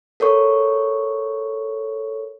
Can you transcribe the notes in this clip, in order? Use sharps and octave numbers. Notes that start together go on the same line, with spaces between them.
A4 A#4 C#5 C#6